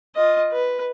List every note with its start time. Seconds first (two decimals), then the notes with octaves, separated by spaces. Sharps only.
0.15 F4 D#5
0.52 B4